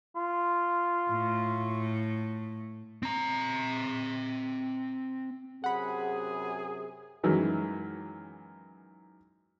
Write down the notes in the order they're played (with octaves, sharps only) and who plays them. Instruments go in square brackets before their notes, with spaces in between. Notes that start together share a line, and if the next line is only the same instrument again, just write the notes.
[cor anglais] F4
[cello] A2 A3
[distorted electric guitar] C4 A#5
[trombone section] F#2 C3 G#4 [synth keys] F#5 B5
[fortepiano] F#2 D#3 E3 G#3